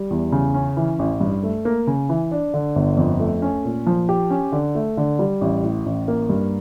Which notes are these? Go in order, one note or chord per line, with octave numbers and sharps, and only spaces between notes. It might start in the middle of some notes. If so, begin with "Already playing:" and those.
Already playing: G3
E2
C#3
C#4
E3
A1
G2
A3
A#3
C#3
E3
D4
D3
G1
F2
A3
C#4
A#2
F3
G4
C#4
D3
A3
D3
G3
A1
A2
A1
A#3
G2